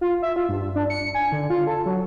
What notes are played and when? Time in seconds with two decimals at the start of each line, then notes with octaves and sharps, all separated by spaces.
0.01 F4
0.22 E5
0.36 F4
0.49 G2
0.75 D4
0.90 C#7
1.15 G#5
1.32 D3
1.50 F4
1.67 A4
1.86 F#3